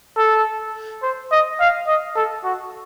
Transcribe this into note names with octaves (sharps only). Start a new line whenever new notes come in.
A4
C5
D#5
F5
D#5
A4
F#4